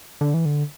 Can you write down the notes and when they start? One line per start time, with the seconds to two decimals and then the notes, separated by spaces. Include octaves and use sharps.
0.21 D3
0.34 E3
0.45 D3